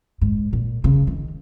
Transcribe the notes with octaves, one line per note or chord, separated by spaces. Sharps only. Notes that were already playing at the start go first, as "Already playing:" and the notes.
G#2
A#2
C#3
D#3